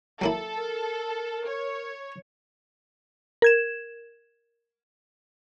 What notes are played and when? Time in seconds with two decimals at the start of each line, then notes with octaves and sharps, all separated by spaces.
0.21 F#3 A#3 E4 A4
0.56 A#4
1.47 C#5
3.42 A#4 G#6 E7